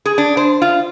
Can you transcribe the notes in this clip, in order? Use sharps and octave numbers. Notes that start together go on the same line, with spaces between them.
G#4
D4
C5
F4